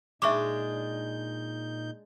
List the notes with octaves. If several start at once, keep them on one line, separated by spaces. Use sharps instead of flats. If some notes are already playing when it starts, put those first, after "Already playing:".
A#2 G#3 D4 D#4 E5 C#6 D6 G6